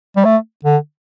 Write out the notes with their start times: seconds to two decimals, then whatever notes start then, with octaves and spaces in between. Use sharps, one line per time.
0.17 G3
0.25 A3
0.65 D3